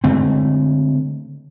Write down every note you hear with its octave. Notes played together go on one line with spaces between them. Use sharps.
D3 G#3 A3 C4